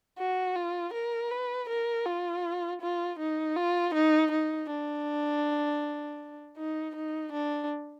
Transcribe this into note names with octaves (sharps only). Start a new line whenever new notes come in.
F#4
F4
A#4
B4
A#4
F4
F4
D#4
F4
D#4
D#4
D4
D#4
D#4
D4